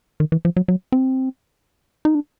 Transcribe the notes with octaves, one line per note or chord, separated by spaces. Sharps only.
D#3
E3
F3
F#3
F#3
C4
D#4
D4